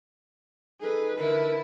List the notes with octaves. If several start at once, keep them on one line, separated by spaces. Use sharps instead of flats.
D#4 G#4 A4 B4
D3 E4 A#4